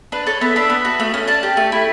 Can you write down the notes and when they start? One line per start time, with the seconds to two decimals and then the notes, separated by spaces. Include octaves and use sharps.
0.12 D4 B4
0.27 A4 C#5
0.41 B3 E5
0.56 D4 E5
0.70 B3
0.85 F#4
1.00 A3
1.14 C#4
1.27 D4 A5
1.43 G4
1.57 A3
1.72 E4